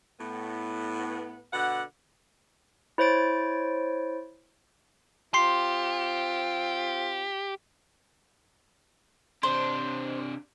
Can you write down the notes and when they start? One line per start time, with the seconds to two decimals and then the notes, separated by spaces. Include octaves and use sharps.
0.19 A2 B3
1.52 B2 D3 F#5
2.98 E4 C5 C#5 A6 D7
5.34 C4 F4 G4 C6 C7
9.43 C3 D4 C5